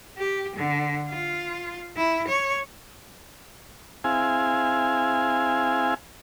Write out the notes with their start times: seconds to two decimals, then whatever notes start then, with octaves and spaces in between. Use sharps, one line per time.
0.18 G4
0.56 D3
1.09 F4
1.97 E4
2.28 C#5
4.04 C4 E4 G#4 F5 G#5